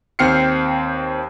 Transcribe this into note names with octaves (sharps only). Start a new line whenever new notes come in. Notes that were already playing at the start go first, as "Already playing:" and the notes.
D#2 C4 G5 F6 C7 C#7